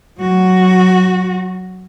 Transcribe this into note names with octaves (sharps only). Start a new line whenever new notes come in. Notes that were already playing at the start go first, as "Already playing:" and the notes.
F#3 F#4